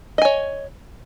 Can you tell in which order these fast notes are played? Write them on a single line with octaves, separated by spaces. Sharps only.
D#5 G#5 C#5